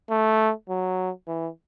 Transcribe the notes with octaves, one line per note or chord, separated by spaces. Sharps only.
A3
F#3
E3